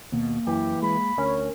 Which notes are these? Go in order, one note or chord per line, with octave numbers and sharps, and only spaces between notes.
D#2 B2 A#3
F#2 E3 G4
G#3 B5
D2 C#4 A#4